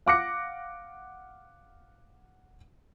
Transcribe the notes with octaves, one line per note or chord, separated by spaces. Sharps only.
F5 F#5 D6 F#6 A#6 C#7